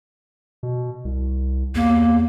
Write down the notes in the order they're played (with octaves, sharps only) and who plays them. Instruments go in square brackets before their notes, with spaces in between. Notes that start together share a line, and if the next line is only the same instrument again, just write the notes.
[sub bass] B2
C2
[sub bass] E2 [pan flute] A#3